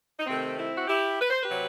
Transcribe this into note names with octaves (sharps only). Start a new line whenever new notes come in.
D#4
C3 D#3 A3 C4
C4 E4
F#4
E4 G4
B4
C5
G4 B4
C3 F#3